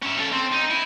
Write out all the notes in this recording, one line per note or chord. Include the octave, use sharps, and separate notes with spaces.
C#4 E5
C#4 A4
C4
D#4
E4